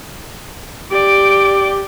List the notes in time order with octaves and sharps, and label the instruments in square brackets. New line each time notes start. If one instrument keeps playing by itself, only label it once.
[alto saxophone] G4 [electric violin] D5 D7